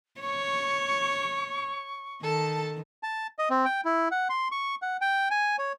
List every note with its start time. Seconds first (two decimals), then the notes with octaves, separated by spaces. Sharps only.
0.21 C#5 C#6
2.23 D#3 A4 A5
3.03 A5
3.39 D#5
3.50 C4
3.65 G5
3.85 E4
4.11 F#5
4.30 C6
4.52 C#6
4.82 F#5
5.01 G5
5.31 G#5
5.59 C#5